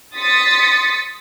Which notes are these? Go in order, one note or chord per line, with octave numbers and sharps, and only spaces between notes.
C6 D#6 A6 B6 C#7